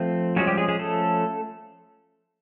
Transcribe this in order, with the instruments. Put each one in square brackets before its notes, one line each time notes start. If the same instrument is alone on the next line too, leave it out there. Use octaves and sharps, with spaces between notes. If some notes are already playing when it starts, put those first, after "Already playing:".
Already playing: [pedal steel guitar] F3 A3 C4
F3 F#3 G#3 C#4 F#4
G3 G4
G#3 G#4
G#3 G#4
A3 A4